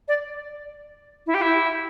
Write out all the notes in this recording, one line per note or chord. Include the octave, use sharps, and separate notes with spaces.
D5
E4
G4
E4